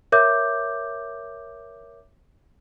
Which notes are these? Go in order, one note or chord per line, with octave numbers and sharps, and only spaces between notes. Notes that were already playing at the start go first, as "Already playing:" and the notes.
A#4 C#5 E5 D6 G6